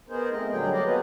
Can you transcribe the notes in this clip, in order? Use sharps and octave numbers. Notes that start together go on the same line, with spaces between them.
B3 D#4 G#4 A#4 C5
A3 C4 D#5
A#2 D3 F#3 G3 G#4 G5
F#4 D5 D#5 F5
F#3 G#3 B3 C4 G#4 B4